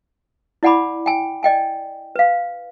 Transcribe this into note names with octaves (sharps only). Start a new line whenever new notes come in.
E4 D5 F#5 G#5 B5 D6
G5 G#5
D5 D#5 G5 G#5
B4 F5